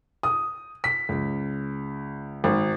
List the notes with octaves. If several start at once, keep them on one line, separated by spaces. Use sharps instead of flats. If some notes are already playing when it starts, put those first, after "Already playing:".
D#6
B6
C#2
G#1